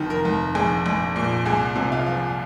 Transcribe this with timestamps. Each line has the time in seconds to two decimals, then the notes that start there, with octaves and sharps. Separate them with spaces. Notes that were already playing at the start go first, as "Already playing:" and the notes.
Already playing: F1 D#3
0.10 A#4
0.25 F1
0.55 A#1 G#4
0.86 A#1
1.16 A#2
1.45 C2 G#4
1.76 C3
1.92 F4
2.06 F3